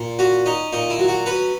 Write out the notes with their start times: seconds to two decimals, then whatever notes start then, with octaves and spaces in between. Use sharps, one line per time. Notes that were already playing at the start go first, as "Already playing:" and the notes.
Already playing: A#2
0.19 C#4 F#4
0.46 C#4 D#4
0.73 A#2 D#4
0.90 E4
0.99 F#3
1.08 F#4
1.26 C#4 B4